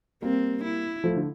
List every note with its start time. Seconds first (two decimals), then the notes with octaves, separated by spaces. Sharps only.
0.22 G3 A#3 C4
0.64 E4
1.04 F3 A3
1.16 D3